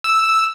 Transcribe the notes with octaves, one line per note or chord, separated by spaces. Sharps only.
E6